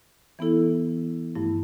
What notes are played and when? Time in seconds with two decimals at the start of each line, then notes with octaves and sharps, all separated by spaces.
0.39 E3 B3 E4 A4
1.35 G2 F3 A3 E4